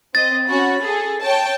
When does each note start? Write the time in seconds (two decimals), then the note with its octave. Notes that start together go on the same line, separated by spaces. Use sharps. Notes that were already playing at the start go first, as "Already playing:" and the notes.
0.15 C4 D#5 A6
0.48 C#4 F#4 B5
0.83 G#4 A4
1.23 C#5 G5 A5